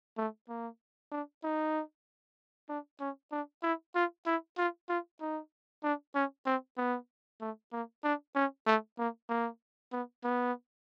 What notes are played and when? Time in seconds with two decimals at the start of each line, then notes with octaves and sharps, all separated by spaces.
0.18 A3
0.49 A#3
1.12 D4
1.44 D#4
2.69 D4
3.01 C#4
3.32 D4
3.63 E4
3.95 F4
4.26 E4
4.58 F4
4.89 F4
5.21 D#4
5.83 D4
6.15 C#4
6.46 C4
6.78 B3
7.41 A3
7.72 A#3
8.04 D4
8.35 C#4
8.67 A3
8.98 A#3
9.29 A#3
9.93 B3
10.24 B3